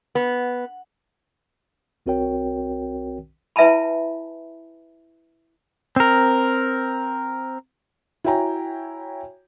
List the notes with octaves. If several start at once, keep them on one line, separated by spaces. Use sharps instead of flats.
B3
B1 C4 F#4 A#4 C#5 G5
E4 B4 E5 G#5 A5 B5
C4 A#4
E4 F#4 C#5 G5 G#5 A#5